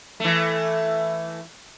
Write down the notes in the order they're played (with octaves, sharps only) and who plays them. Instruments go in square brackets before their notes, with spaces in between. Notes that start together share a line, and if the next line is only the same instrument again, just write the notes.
[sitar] E3 A3